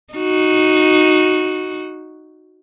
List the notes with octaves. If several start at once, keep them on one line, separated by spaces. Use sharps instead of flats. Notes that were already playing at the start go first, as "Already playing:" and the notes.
D#4 F#4